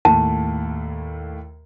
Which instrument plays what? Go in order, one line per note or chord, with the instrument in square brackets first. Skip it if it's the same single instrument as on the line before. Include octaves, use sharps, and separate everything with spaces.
[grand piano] D#2 A2 [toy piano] A5